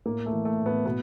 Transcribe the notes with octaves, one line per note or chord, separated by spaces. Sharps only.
A2 A#3
A3
E3
A3
A2
B3
B2 B3